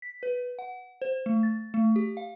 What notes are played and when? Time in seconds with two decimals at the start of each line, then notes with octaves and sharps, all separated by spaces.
0.02 B6
0.23 B4
0.59 F#5
1.02 C5
1.26 A3
1.43 A6
1.74 A3
1.96 G4
2.17 F5